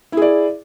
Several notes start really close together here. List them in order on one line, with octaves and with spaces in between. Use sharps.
E4 G#4 D5